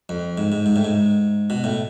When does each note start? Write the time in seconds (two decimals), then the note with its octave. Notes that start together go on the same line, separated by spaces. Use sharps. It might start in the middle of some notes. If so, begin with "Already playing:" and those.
0.09 F2
0.38 G#2
0.52 G#2
0.66 G#2
0.76 A2
0.85 G#2
1.50 B2
1.64 A2